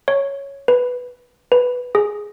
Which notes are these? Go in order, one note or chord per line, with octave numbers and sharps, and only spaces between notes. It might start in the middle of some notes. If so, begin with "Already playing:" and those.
C#5
B4
B4
G#4